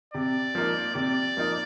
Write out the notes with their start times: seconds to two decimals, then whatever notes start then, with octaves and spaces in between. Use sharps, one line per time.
0.14 C3 D5
0.55 F3 A#3 D#4
0.95 C3 D5
1.37 F3 A#3 D#4